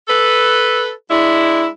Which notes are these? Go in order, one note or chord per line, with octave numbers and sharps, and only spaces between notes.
A4 B4
G#3 D4 E4